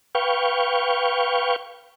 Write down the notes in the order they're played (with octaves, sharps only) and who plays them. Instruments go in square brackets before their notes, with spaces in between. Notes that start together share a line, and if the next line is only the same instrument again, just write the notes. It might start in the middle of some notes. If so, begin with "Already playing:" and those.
[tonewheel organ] B4 F5 G5 C#6